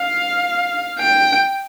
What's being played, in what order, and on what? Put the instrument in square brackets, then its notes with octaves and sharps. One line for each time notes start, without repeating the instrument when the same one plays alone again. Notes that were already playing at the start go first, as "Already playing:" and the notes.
Already playing: [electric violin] F5
G5